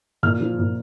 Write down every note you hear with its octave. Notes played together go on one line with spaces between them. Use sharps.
A#2 F6
F3
A#2